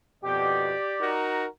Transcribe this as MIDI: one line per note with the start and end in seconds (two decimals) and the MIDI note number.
0.24 0.74 41
0.24 0.74 47
0.24 1.06 67
0.24 1.15 74
1.00 1.46 63
1.00 1.46 66
1.00 1.46 70